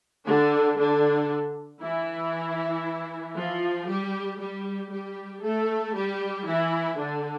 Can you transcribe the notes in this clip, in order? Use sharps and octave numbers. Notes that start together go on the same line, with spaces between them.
D3 D4
D3 D4
E3 E4
F3 F4
G3 G4
G3 G4
G3 G4
A3 A4
G3 G4
E3 E4
D3 D4